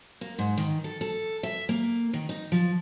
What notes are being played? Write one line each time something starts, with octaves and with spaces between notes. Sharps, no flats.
A#3
G#2
D#3
A4
A4
E5
A#3
D#3
D#4
F3